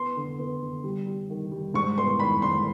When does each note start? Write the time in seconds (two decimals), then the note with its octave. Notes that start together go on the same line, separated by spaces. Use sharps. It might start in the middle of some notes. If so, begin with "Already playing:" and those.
Already playing: B3 C6
0.17 D3
0.39 B3
0.61 D3
0.84 G3
1.06 G3
1.30 D#3
1.52 G3
1.74 G#2 C#6
1.98 B3 C6
2.20 D#3 B5
2.42 G#2 C6